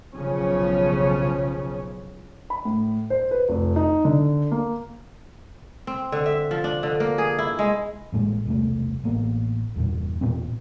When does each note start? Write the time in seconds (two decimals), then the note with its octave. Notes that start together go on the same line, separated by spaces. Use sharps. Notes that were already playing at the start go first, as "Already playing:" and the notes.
0.15 B1 C#3 F3 C#4
2.50 B5
2.65 A2
3.10 C5
3.31 B4
3.49 F1
3.76 D#4
4.05 D3
4.52 A#3
5.87 C4
6.12 D3
6.26 E5
6.51 F3
6.64 D4
6.83 D3
7.00 A#3
7.18 G#4
7.39 E4
7.59 G#3
8.12 A1 A#2 G#3
8.46 E1 C2 B2 A3
9.04 A1 A#3 B3
9.76 E2 G2 A#2
10.21 E2 A#2 B3 C4